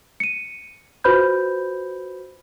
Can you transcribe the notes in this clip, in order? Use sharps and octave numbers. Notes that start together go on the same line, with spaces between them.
C#7 D#7
F4 F#4 B4 C5 B5 G6